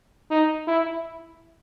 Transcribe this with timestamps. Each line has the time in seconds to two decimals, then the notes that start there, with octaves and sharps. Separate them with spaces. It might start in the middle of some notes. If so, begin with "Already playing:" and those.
0.30 D#4
0.67 E4